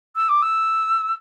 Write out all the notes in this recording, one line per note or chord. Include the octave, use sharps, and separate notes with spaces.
E6
D6
E6